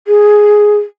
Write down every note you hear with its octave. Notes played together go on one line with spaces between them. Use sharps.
G#4